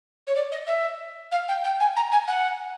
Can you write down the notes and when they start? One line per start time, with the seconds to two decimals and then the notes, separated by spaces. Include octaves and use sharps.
0.27 C#5
0.35 D5
0.51 D#5
0.66 E5
1.31 F5
1.48 G5
1.64 G5
1.80 G#5
1.96 A#5
2.11 G#5
2.27 F#5